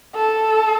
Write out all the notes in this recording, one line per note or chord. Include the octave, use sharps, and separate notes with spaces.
A4